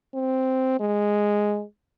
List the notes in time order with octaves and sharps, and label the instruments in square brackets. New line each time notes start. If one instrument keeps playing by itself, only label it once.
[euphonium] C4
G#3